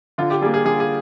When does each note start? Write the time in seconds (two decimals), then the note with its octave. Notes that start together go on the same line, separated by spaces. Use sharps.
0.18 D3 F4
0.30 G4
0.41 G3 G#4
0.46 A#3
0.54 G#4
0.65 D3 G#4
0.80 G#4